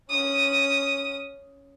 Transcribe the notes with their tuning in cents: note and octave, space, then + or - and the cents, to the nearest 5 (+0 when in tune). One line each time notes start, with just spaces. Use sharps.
C#4 +0 D#6 +0